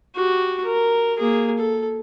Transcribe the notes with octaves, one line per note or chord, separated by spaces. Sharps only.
F#4 G4
A#4
A#3 G#4
A4